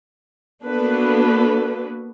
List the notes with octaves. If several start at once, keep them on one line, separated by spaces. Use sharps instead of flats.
A#3 B3 D4 F#4 A4 B4